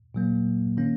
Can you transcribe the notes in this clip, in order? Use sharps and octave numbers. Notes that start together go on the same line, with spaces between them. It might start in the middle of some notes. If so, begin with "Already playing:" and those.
A#2 F#3 A#3
D#3 A#3 C#4